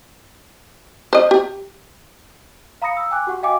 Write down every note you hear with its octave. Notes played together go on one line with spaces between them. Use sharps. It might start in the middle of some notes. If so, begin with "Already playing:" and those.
C5 D#5
G4
F5 A#5 B5 D#6 A#6 C#7
E6
G5 G#5 D6 F#6
F#4 G4 F#5 C#6
F#4 D#5 F5 G5 G#5 D6